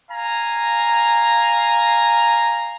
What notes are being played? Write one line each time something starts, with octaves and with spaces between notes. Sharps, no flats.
F5 G#5 A#5